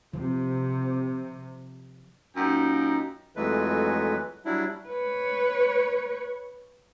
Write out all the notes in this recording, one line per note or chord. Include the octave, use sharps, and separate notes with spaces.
C3 F3
F#2 A#2 D#4 G5
F2 E3 F#3 G#3 A3 B4
F#3 G3 D4 E4
B4 C#5